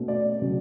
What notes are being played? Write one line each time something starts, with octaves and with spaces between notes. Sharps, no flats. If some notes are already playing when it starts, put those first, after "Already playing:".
Already playing: B2 A3 C#4
D5
C#3 F#3 C#4